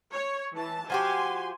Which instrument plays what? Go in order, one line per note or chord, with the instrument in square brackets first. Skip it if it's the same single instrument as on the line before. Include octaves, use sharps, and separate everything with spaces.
[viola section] C#5
E3 A5
[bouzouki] F3 F#4 G4 [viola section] G#5 C6